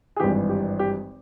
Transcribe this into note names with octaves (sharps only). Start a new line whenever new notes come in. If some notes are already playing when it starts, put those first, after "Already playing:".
G#4
G#1 G2 E3 G4
G4
G4